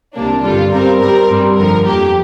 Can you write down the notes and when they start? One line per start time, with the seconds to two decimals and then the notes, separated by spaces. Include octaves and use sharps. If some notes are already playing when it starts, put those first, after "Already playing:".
0.15 C2 C3 A#3 D4
0.43 G1 G2 D3 G3 F4
0.72 G2 G3 C4 A#4
1.01 G2 G3 C4 A#4
1.30 G2 G3 C4
1.58 G1 F2 D3 F3 A#4
1.86 F2 F3 A#3 G4